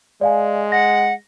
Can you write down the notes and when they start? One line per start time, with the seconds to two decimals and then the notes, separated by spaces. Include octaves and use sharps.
0.21 G#3 D5 F5 G#5
0.72 F#5 A#6